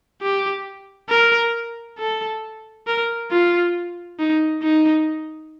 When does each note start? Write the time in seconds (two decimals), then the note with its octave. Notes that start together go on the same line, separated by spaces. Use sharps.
0.22 G4
1.09 A#4
1.98 A4
2.87 A#4
3.31 F4
4.20 D#4
4.63 D#4